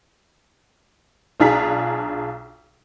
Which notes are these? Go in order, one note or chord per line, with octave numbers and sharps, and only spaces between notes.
B1 D4 F4 G#4 A#5 B6